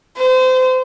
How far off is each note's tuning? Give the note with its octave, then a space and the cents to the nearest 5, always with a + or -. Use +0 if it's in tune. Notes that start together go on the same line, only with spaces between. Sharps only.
C5 -30